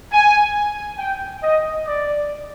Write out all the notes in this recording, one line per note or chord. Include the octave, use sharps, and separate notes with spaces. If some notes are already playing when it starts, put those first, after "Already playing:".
G#5
G5
D#5
D5